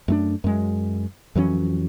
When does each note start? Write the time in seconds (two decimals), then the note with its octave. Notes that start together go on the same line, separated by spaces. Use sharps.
0.08 F#2 A3 D4
0.44 F#2 G#3
1.35 F2 E3 F#3 C#4